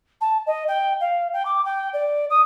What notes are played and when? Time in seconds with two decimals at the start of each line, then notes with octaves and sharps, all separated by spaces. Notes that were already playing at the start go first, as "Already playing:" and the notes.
0.21 A5
0.46 D#5
0.67 G5
1.00 F5
1.33 G5
1.45 D6
1.65 G5
1.93 D5
2.29 D#6